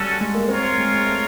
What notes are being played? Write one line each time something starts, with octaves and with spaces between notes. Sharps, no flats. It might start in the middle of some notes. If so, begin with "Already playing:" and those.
Already playing: G3 C#4 F#4 A4
G#3
A#3
C4 F4 A#4 C#5
G#3
A3